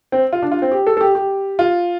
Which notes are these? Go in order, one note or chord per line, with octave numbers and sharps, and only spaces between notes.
C4
F4
D4
F4
C4
G4
A4
A4
G4
G4
F4